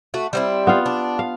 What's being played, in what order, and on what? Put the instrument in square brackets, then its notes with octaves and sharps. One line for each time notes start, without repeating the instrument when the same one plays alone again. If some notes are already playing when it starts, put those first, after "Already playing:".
[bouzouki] A3 F#4
G3 C4 E4
[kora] B3 F4 F5
[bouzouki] D4
[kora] F5